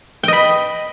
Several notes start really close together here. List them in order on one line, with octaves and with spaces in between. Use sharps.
G5 D#5 B5